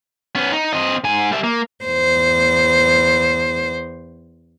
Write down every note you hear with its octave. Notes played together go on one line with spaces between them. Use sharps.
B3 C#4
D#4
C4 D#5
G#2 G#5
G3 E5
A#3
E2 C5